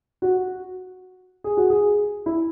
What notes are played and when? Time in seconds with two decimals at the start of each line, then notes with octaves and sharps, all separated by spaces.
0.22 F#4
1.44 G#4
1.57 F#4
1.70 G#4
2.26 E4